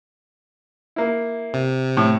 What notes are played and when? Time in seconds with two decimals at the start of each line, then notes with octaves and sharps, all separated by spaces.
0.96 A#3 E4
1.54 C3
1.97 A2